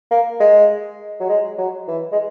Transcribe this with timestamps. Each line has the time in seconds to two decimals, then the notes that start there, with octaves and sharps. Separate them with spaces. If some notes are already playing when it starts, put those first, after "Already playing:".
0.11 A#3
0.40 G#3
1.20 F#3
1.29 G#3
1.58 F#3
1.88 E3
2.12 G#3